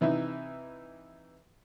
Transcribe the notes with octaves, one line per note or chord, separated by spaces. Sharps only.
C3 E3 D#4 E5